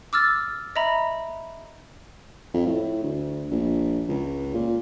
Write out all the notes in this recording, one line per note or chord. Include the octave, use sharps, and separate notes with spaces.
D6 E6 F6 A6
D#5 E5 A#5 B5
F2
A2
D2
A#1
C#2
A#2